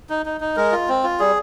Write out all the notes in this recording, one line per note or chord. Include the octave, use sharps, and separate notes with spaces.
D#4
D#4
D#4
G#3 A#4
F4
C4
F4
G3 G#4